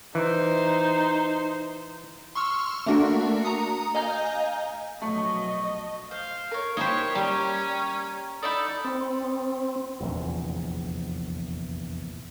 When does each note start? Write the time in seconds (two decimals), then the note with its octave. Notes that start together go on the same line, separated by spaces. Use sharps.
0.15 E3 D#4 C5
2.35 C6 C#6 E6 F6
2.86 A3 A#3 D4 F#4 A4 A#4
3.42 A#5 D#6 C#7
3.95 D#5 F5 G#5 A#5 G6
5.02 A#1 B2 F#3 A3 D#5 C#6
6.11 C5 F5
6.51 A#4 C#5
6.77 A#3 D#4 E4 G4 C5 C#5
7.15 G3 C#4 G4 C#5 A#5
8.43 D#4 E4 A4 D5 B5 D#6
8.85 C4
10.00 F1 A#1 E2